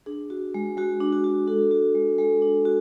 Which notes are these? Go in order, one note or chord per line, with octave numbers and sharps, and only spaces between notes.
D4 G#4
F#4
G#3
G#3 F#4
D4
F#4
F#4
D4 F#4 A4
F#4
G#3
G#3 F#4 A4
D4
F#4